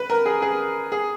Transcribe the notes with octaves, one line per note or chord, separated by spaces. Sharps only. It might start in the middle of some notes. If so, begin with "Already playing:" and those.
Already playing: B4
A#4
G#4
G#4
G#4